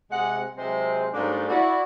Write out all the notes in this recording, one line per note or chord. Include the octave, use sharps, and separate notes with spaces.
C3 G#3 F#5
C3 F#3 G#3 C5
G#2 G3 A3 A#3 C#4 D4
E4 F#4 D5